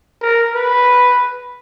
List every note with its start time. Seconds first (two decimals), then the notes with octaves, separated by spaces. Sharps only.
0.21 A#4
0.54 B4